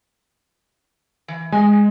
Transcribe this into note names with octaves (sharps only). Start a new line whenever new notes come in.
E3
G#3 D#5 G#5